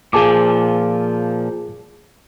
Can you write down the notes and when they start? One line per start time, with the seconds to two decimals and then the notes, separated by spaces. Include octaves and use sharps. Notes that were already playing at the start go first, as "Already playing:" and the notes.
0.13 A#2 F3 G#4 A5 D6